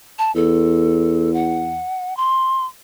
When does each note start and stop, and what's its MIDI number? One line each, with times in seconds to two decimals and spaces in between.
0.19 0.34 81
0.35 1.84 40
0.35 1.31 69
1.34 2.16 78
2.17 2.66 84